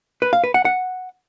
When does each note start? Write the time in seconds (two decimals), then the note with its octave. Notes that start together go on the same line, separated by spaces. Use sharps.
0.22 B4
0.33 F5
0.44 B4
0.54 F#5
0.65 F#5